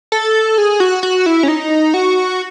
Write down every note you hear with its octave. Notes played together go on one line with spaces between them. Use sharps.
A4
G#4
F#4
F#4
E4
C#4
D#4
F#4